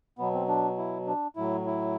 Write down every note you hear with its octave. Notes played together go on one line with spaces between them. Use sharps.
B2 F#3 B3
C4
D4
E4
D4
A2 F#3 E4
E4